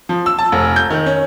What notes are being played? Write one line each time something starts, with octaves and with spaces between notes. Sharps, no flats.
F3
E6
A5
F1
G6
D#3
C#4